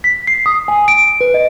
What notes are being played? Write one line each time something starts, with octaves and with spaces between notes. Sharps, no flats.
B6
C7
D#6
G#5
D7
B4
D#5